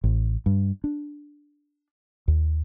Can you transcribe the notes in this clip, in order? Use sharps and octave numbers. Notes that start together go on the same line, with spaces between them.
A1
G2
D4
D#2